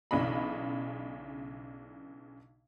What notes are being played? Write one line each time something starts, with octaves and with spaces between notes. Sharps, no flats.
B1 C#3 E3 D4 D#5 B5